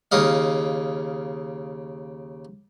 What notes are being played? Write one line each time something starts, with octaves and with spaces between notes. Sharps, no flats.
D#2 C#3 D#5 F5